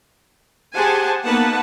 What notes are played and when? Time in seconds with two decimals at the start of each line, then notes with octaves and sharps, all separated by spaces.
0.74 G4 G#4 C5 F#5 G#5 A5
1.25 A#3 B3 D#4 B4 F#5 A5